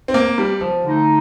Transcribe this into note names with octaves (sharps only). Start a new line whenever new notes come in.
C4
A#3
G3
F3
D3 A3 D#4